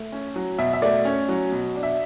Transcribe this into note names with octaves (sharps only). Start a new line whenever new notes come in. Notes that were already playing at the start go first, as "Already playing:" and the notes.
Already playing: A3
C#4
F#3
B2 E5
E5
A3 D5
C#4
F#3
B2
D4
E5